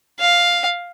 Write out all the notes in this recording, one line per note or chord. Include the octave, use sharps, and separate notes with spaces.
F5